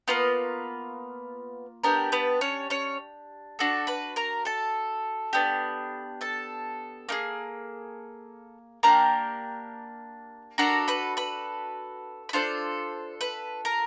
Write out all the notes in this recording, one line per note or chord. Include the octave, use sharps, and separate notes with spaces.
A#3 B3 F4 B4
B3 D4 G4 A#4
B3 B4
C#4 C#5
C#4 C#5
D4 F#4 A4
B4 B5
A#4 A#5
A4 A5
B3 D4 G4
A4 A5
A#3 D#4 G#4
A#3 D4 G4 A#4 A#5
D4 F#4 A4 A#4 A#5
B4 B5
B4 B5
B5
D4 F4 A4 C5 C6
B4 B5
A#4 A#5